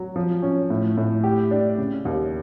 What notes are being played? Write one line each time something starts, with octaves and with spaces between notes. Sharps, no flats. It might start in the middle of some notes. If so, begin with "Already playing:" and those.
Already playing: F#3
F3
C#4
A2
A2
G4
D4
C#3
D#2